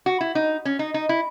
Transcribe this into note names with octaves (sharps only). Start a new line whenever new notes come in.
F#4
E4
D#4
C#4
D#4
D#4
E4